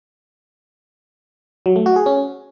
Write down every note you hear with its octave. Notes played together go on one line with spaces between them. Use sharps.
F#3
A3
F#4
G#4
C#4